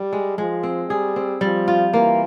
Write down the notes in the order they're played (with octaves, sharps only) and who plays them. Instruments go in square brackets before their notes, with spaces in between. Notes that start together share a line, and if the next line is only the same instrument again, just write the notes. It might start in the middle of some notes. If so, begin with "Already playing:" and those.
Already playing: [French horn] G3
[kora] G#3
[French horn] F3 [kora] G#3
[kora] C4
[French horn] G3 [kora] G#4
[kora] C4
[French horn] F3 [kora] G3
[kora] F4
[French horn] E3 [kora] A#3